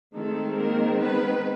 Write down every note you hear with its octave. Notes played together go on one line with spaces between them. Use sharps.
D#3 G#3 A3 C4 A4
A#3 A#4
B3 B4